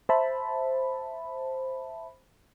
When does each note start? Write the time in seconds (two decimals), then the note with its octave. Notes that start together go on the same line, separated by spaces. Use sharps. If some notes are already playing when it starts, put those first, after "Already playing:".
0.09 C5 E5 A5 B5